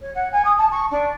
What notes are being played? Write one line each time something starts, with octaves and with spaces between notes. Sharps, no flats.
C#5
F#5
G#5
D#6
A5
C#6
D4